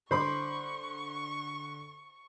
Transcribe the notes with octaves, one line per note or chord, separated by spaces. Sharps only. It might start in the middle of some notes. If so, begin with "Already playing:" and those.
D3 C5 B5 C#6 D6